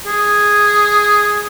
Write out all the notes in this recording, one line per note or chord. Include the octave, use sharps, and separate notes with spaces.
G#4